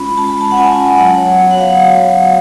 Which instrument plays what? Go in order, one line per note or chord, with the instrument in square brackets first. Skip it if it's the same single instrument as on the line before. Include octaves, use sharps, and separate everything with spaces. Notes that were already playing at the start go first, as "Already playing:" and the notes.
Already playing: [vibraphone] G#3 C#4 F4 B5
G#3 A5
B5
A5
F#5
C#4 F4 G#5
F#3 F#5
C#5
B3 F#4 C#5
F#5
F5